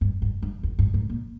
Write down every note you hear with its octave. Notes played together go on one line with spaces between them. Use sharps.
G2
G2
G2
E2
G2
G#2
A#2